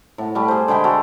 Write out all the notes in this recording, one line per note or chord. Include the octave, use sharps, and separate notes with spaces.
A2 F#5
G3 A3 B5
G#4 C5
D3 G#3 G5 B5
F#4 A4 A#5